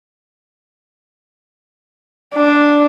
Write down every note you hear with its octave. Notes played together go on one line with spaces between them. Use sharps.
D4